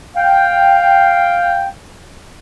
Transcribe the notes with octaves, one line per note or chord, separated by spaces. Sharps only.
F5 G5